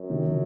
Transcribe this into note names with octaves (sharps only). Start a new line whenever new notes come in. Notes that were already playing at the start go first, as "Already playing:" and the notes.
Already playing: F#2
C3 D#3
C#3 F3